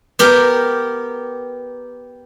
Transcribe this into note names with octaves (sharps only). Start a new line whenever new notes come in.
B3 G4 A#4